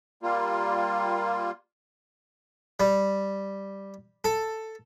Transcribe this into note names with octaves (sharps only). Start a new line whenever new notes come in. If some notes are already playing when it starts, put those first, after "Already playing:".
G3 A#3 F4
G3
A4